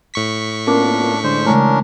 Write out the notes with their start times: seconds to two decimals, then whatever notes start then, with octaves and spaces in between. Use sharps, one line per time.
0.14 A2 C#6 B6
0.67 A#3 B3 C#4 D4 F4 A#4 D6
1.24 D3 G#3 D4 C5
1.46 C#3 E3 G#3 A3 C#4 D4 A#4